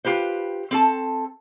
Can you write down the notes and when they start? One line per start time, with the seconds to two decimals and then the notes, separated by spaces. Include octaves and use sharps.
0.05 F4 G4 B4 C5
0.71 C4 A4 A5